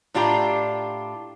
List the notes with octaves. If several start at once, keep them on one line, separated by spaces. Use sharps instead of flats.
A2 D4 F4 G4 A#5